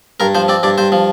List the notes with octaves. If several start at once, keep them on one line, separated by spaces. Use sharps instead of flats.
G2 A#4
F3 C5
C4 D5
G2 D5
G2 C5
F3